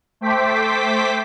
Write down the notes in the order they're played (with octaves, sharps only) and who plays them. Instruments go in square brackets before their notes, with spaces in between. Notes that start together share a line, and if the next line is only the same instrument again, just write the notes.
[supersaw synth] A3 C5 G5 D6 B6